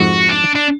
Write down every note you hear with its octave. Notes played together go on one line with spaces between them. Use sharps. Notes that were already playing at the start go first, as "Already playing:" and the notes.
Already playing: F2 G#2 F#4
D4
D4